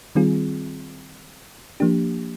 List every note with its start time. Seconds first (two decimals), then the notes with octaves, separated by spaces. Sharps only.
0.15 D#3 G3 C4 F4 G#4
1.80 F3 A#3 D4 G4